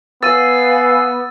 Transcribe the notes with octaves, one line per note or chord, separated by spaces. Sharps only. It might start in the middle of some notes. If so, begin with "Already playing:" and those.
B3 B4 F5 G#5 E6 A6 D#7